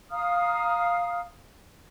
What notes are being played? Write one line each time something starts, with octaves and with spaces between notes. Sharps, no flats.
F5 A#5 D#6 F6